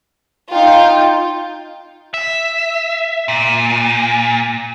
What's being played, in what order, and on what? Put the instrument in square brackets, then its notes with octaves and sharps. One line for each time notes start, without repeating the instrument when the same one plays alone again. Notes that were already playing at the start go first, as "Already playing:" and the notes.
[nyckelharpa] D#4 [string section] F4 [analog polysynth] G5
[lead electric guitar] E5
A#2